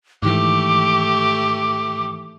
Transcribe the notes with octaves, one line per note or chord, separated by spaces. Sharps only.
G#2 D#3 E3 A3 G4 D6